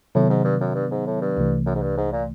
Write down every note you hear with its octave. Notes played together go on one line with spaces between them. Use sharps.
A2 C3 D#3 F#3 B3
G#2
G2
F#2
G2
G#2
A2
G2
C2 C3 E3 A3
F#2
G#2
G2
G#2
A#2